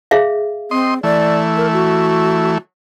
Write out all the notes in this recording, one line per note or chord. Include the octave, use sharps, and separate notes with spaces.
G#4 E5 F5
C4 D#5 C6
E3 A3 D5
A#4
F#4